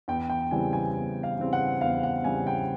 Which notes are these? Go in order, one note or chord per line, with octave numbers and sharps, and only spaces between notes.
E2 G5
G5
C#3 E3 G3 C4 G#5
G#5
E2
F5
C#3 E3 G3 C4
F#5
E2 F5
F#5
C#3 E3 G3 C4 G#5
G5